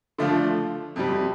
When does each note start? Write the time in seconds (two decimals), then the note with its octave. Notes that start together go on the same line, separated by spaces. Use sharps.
0.18 D3 F3 A3 D4 F4
0.96 F2 C3 G3